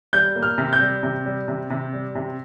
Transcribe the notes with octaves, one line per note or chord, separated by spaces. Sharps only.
G3 G6
A#3
F6
C3
G6
G3
C3
G3
C3
C3
G3
C3